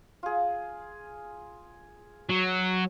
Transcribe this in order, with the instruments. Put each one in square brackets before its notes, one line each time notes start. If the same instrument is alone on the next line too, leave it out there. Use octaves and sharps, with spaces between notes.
[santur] F4 G#4
[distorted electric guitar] F#3